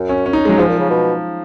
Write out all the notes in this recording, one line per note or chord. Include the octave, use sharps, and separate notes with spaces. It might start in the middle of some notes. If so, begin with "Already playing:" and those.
Already playing: F#2
C#4
C#4
D#4
G#3
F#3
G#2 F3
A#2
C#3
B2